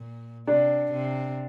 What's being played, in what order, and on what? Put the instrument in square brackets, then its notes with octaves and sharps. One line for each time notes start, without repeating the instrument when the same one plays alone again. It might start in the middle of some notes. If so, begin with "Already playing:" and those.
Already playing: [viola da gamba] A#2
[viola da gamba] C3 [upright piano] D4
[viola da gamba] C3